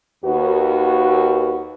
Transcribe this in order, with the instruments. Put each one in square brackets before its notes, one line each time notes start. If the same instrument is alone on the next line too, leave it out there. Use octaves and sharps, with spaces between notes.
[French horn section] D#2 F#4 B4